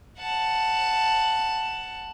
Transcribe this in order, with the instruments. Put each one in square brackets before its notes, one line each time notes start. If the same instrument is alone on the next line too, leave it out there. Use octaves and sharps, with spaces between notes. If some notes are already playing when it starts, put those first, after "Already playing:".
[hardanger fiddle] F#5 A5